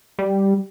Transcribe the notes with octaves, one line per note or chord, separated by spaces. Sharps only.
G3